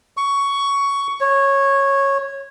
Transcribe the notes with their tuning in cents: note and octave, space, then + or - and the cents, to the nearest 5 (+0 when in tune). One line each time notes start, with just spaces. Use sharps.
C#6 +10
C#5 -10